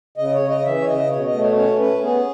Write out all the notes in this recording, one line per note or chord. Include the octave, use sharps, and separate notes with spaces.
C#3 D#5
C#5
C#3
D#5
E3 E5
C#5
C#3 D#5
B2 C#5
D#5
A3
C#5
C#4 C#5
C#4 B4
B3 G#4